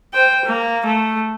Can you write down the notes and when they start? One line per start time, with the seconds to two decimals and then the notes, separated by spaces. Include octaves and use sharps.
0.13 C5 G5
0.45 A#3
0.86 A3